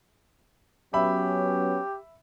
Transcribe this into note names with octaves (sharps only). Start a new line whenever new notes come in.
F#3 B3 C#4 G4 E5 B5